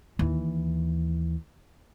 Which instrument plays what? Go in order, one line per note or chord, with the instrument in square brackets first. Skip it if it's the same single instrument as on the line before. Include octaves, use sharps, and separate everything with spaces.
[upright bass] D#2 E3